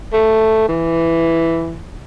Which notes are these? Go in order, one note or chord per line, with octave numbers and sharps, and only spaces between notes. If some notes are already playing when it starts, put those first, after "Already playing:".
A3
E3